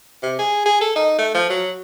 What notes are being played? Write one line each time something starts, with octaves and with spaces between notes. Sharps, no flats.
C3
G#4
G#4
A4
D#4
A3
F3
F#3